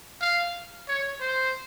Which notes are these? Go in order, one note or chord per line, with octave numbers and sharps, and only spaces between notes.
F5
C#5
C5